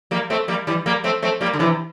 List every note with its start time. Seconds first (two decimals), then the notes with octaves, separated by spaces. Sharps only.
0.11 G3 A#3
0.30 A3 C4
0.48 G3 A#3
0.67 E3 G3
0.86 G3 A#3
1.04 A3 C4
1.22 A3 C4
1.41 G3 A#3
1.54 D3
1.59 C3 E3